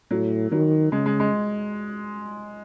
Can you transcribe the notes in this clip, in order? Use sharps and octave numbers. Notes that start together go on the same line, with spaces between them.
A2 F#3
D#3 F#3
C#3 G#3
G#3
G#3